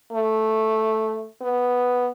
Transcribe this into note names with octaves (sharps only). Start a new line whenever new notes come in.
A3
B3